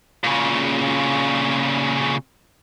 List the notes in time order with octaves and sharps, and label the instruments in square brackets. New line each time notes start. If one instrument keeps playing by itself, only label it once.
[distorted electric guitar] A#2 C#3